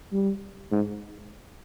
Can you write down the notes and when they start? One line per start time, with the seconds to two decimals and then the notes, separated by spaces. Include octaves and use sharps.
0.12 G3
0.72 G#2